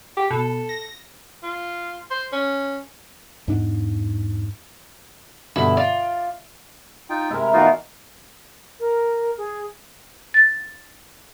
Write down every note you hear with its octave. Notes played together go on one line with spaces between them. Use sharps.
G4
B2 A4
A#6
F4
C5
C#4
E2 G#2 D4
G2 B2 D3 E4
F4 D5
D#4 F4 G5
C3 G#3 E4 A#4
B2 E3 D#4 F4 F#4 F5
A#4
G#4
A6